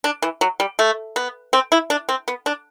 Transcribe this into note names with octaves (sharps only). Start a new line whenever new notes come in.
D4
E3
F#3
G3
A3
B3
C4
E4
D4
C4
B3
D4